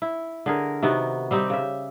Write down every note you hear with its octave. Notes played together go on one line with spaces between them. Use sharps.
E4
D3 G#4 A#4
C3 D#3 B3 F#4
G3 C4 D#4 G4
C#3 E5